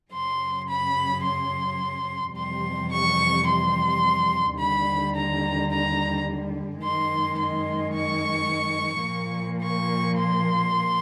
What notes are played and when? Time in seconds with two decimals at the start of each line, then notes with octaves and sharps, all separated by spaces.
0.11 F#2 C#3 F#3 C6
0.68 B5
1.24 C6
2.35 F2 C3 E3 G3 C6
2.91 C#6
3.47 C6
4.58 D#2 D3 G3 B5
5.14 A#5
5.70 A#5
6.81 F#2 D#3 G#3 C6
7.37 C6
7.93 C#6
9.05 A#2 F3 A#3
9.61 C#6
10.17 C6